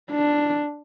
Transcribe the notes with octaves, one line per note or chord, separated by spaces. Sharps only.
D4